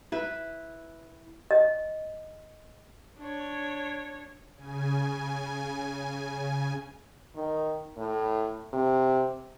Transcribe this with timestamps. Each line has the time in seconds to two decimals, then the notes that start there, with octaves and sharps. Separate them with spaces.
0.12 E4 B4
1.51 D#5
3.20 D4 C#5
4.56 C#3 G#5
7.36 D#3
7.98 A2
8.73 C3